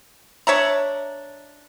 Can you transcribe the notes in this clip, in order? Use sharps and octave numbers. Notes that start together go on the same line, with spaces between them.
D4 C#5 E5 A#5